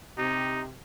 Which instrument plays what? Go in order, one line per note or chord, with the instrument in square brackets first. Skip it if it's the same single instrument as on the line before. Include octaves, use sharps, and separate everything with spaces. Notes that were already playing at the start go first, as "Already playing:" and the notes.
[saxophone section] C3 G4 [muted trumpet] D#4